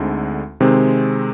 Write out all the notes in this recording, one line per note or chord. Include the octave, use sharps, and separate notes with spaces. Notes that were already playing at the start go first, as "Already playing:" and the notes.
Already playing: D2 D3 G#3 C4 D#4
C3 D#3 G#3 C4